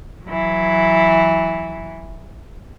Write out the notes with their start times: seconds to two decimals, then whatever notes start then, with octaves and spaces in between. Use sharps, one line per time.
0.24 E3 F#3